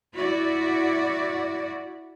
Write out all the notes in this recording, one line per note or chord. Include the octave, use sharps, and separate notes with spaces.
E4 F#4 D5